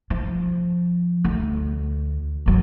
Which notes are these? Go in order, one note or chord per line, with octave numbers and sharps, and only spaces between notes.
F3
D2
G1 F#3